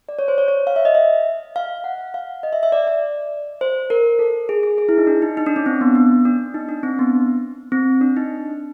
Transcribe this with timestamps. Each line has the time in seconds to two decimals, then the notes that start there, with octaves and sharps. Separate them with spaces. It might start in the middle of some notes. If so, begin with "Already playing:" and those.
0.09 D5
0.19 C#5
0.28 C5
0.38 C#5
0.48 C#5
0.67 F5
0.76 E5
0.85 D#5
0.95 E5
1.56 F5
1.84 F#5
2.14 F5
2.43 D#5
2.53 E5
2.63 E5
2.72 D5
2.87 D5
3.61 C5
3.90 A#4
4.19 A4
4.49 G#4
4.63 G#4
4.78 G#4
4.89 E4
4.98 D#4
5.07 D4
5.22 D#4
5.37 D#4
5.46 D4
5.56 C#4
5.66 C4
5.81 B3
5.95 B3
6.25 D4
6.54 D#4
6.69 D4
6.83 C4
6.99 B3
7.72 C4
8.01 D4
8.16 D#4